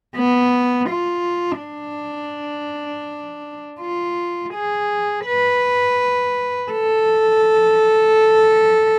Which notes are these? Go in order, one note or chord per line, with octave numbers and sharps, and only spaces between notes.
B3
F4
D4
F4
G#4
B4
A4